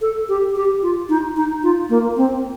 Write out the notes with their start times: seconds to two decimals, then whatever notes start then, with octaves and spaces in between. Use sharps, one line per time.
0.01 A4
0.29 G4
0.56 G4
0.82 F4
1.09 D#4
1.36 D#4
1.63 F4
1.90 A#3
2.17 C4